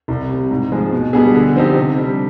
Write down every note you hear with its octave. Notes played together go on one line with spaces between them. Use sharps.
C2
C3 G3
G#2
F3 G#3
B2
G3 B3 D4 G#4
D3
F3 C4 D#4 G4
C3
G3 D4